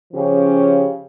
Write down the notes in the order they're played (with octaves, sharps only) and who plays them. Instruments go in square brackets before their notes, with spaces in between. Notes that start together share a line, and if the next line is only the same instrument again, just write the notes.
[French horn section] C#3 F3 C#4 G4